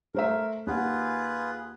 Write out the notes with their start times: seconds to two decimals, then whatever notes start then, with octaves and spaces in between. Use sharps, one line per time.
0.14 A3 A#4 C5 E5
0.67 D#2 F4 G#4 B4 F#5